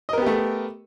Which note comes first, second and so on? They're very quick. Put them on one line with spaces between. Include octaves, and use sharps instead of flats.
D#5 A#4 B3 G4 A3